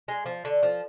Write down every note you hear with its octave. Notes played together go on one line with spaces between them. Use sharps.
G#3
F3
D3
F3